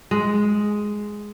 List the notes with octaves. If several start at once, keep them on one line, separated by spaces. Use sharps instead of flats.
G#3